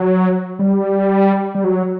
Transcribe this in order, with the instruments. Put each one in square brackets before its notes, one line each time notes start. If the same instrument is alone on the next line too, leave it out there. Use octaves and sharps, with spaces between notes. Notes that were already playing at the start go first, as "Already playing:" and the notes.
Already playing: [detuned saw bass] F#3
G3
G3
F#3